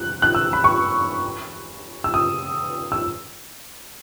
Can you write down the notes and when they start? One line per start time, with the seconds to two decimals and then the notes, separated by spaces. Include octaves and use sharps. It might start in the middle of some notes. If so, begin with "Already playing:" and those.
Already playing: F#6
0.22 F#6
0.35 E6
0.53 B5
0.64 C#6
2.04 E6
2.14 D#6
2.92 E6